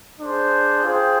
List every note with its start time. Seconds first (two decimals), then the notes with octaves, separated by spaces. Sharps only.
0.20 D4 G#4 C5
0.84 F4 G#4 C5 G5